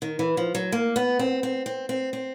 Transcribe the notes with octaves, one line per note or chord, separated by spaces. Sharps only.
D#3
E3
F3
F#3
A#3
B3
C4
C4
C4
C4
C4